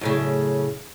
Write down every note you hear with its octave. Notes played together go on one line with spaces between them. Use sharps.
F#2 A2 C#3